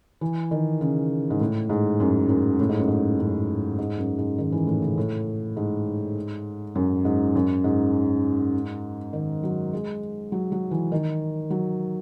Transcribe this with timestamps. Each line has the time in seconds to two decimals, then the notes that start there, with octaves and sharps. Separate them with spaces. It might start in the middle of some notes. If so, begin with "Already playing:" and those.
0.21 E3
0.51 D#3
0.81 C#3
1.30 G#2
1.41 A2
1.69 G#2
2.00 F#2
2.29 F#2
2.60 A2
2.69 G#2
2.78 F#2
2.88 G#2
3.19 F#2
3.78 G#2
3.97 F#2
4.18 G#2
4.38 D#3
4.52 E3
4.67 A2
4.82 C#3
4.98 A2
5.57 G#2
6.75 F#2
7.05 G#2
7.35 F#2
7.64 G#2
9.13 D#3
9.43 F#3
9.73 G#3
10.32 F#3
10.52 F#3
10.71 E3
10.92 D#3
11.50 F#3